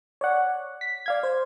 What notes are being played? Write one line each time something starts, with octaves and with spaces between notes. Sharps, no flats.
C#5 D5 F#5
B6
D5 F5 G#6
C5